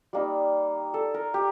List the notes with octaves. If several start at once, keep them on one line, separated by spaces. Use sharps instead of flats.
G3 A#3 D#4
A4
A#4
G4